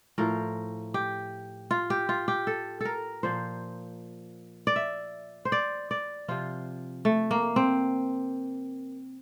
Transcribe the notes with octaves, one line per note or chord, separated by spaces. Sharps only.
A2 F3 A#4
G4
F4
G4
F4
G4
A4
A4 A#4
A#2 F3 C5
D5
E5
C5
D5
D5
C3 F3 F4
A3
A#3
C4